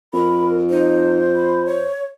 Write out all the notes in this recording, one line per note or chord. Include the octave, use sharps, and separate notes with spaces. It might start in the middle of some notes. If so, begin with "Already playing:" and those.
F2 A#4 B5
D#4 C5
B5
C#5